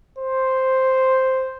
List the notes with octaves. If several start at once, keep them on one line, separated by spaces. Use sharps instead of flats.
C5